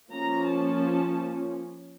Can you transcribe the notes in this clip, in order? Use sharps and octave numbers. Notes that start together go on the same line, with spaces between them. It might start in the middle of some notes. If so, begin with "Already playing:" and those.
F3 A#3 C#4 A#5
A5